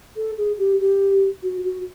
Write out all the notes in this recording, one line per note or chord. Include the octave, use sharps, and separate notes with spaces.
A4
G#4
G4
G4
F#4
F#4